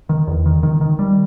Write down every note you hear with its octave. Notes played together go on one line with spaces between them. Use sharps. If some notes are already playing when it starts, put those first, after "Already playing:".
D#3
E2
D#3
D#3
D#3
G3